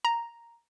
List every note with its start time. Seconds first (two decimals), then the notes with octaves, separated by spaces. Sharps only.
0.05 A#5